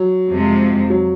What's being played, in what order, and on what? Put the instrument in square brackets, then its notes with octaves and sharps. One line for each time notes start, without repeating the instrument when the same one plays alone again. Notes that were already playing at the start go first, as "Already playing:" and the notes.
Already playing: [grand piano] F#3
[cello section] F2 C3 F3 G#3
[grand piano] F#3